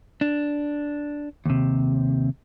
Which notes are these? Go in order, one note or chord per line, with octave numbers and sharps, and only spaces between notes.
D4
D#2 C3